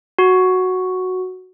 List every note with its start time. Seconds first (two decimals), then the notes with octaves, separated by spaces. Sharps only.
0.19 F#4